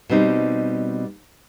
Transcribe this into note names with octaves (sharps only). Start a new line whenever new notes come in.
B2 G3 C4 D#4